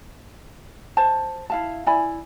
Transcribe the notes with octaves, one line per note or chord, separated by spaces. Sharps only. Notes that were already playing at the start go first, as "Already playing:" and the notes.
C5 A5
E4 F5 A5
E4 D5 G#5 B5